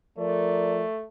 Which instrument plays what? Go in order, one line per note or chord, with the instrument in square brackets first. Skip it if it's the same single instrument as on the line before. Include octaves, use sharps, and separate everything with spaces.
[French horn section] F3 A#4 D5 [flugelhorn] A3